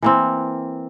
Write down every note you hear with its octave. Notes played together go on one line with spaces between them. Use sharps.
E3 A#3 C4